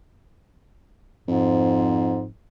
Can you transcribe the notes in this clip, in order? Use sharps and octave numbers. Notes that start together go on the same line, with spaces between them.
F2 G#2